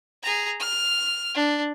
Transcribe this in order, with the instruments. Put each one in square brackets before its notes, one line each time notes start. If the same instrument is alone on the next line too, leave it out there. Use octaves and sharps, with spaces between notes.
[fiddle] G#4 A#5
F6
D4